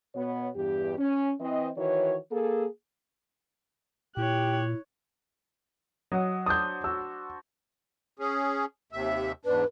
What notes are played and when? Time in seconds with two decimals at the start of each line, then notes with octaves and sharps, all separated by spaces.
0.15 B2 B3 C#5
0.55 E2 G2 G4
0.98 C#4
1.39 E3 C4 D#5
1.77 D#3 E3 F#4 C#5
2.31 A#3 G#4 A4
4.17 A#2 E4 G4 C#5 F#6
6.12 F#3 D#5 F#5
6.46 D4 C5 D#6 G6
6.84 F#4 E6
8.19 C#4 G#4
8.92 D#2 C3 E5
9.45 E2 G#2 D4 B4